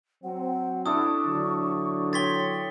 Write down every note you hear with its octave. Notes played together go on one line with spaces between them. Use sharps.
F#3 C4 F#5
D4 E4 A4 C#6 D#6
D3 F#3
C#5 G5 C6 A6 B6 G7